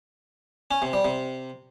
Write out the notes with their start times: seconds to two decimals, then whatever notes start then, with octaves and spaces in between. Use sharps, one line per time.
0.71 C#4
0.82 C3
0.93 G3
1.05 C3